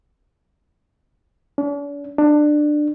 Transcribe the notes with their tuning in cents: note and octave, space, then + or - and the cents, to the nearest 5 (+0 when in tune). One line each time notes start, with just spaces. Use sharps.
D4 -45
D4 +20